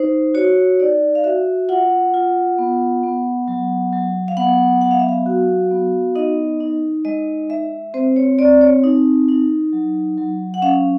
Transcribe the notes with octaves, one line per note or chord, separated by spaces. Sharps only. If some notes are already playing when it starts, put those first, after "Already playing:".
Already playing: D#4 C5
F#4 C#5
D#4 D5
F5
F#4 E5
F4 F#5
F4
B3
B3
F#3
F#3
F5
B3 F#5
F#3 F#5
F5
E5
F5
F#4
B3
D#4 D#5
D#4
G#3 D#5
G#3 E5
C4 C5
C#5
C4 D5
C#5
D#4
D#4
F#3
F#3
F#5
C#4 F5